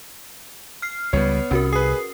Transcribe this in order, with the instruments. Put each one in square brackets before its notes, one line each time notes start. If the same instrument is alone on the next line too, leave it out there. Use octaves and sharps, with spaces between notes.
[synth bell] F6 C7
[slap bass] C#2 F#3 G3 [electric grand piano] B3 C#5
[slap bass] C2 [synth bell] C#4 F#4 A#4
[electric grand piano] G#4 B4 [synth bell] D#6 C7